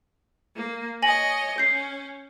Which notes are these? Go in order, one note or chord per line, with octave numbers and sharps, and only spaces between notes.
A#3
C#5 D#5 G#5 A#6 F#7
C#4 G6 C7